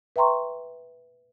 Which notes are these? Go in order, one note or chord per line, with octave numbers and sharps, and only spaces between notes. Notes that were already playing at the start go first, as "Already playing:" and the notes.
B4 E5 G5 A#5 C6 C#6